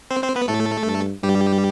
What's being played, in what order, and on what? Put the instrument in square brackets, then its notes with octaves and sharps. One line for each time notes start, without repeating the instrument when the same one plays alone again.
[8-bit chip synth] C4 C5
C4 C5
B3 B4
[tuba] A2 [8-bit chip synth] A3 A4
[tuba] G2
[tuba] G2 [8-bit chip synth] G3 G4